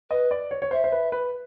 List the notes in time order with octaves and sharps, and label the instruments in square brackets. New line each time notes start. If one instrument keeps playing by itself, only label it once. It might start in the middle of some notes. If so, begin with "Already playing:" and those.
[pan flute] B4 [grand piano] D#5
[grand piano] D5
C#5
C#5
[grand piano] C5 [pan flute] E5
[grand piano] C5
B4
B4